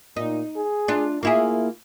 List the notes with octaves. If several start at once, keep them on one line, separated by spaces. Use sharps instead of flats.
A#2 D#4
G#4
D4 F4
A#3 E4 F4 G#4